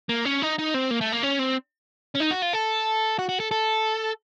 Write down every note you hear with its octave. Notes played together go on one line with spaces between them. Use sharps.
A#3
C#4
D#4
D#4
C4
A#3
A3
A#3
C#4
C4
C#4
D#4
F#4
F4
A4
F#4
F#4
A4
A4